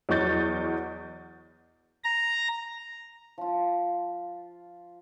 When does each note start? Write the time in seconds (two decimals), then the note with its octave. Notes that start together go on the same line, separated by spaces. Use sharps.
0.09 E2 F#3 D#5 C#6 G6 A6
2.04 A#5
3.38 F3 F4